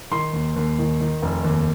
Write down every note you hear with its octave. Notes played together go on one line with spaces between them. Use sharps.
D#3 C6
D#2
D#2
D#3
D#3
F1
D#2